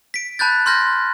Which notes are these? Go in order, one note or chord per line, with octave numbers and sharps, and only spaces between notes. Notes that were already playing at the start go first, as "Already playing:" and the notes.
B6 D7
A5 B5 F#6 G6 A6
C6 F6 G6 A#6